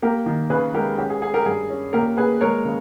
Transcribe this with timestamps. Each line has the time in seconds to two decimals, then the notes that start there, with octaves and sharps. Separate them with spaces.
0.02 A#3 G4 A#4
0.26 D#3
0.50 C#3 G#4 B4
0.74 G#3 G4 A#4
0.98 C#4 G4
1.10 G#4
1.21 C#4 G#4
1.34 G4 A#4
1.46 G2 G#4
1.70 C#4
1.93 A#2 G4 A#4
2.17 A#2 G#4 B4
2.41 G#3 A#4 C#5
2.65 C#3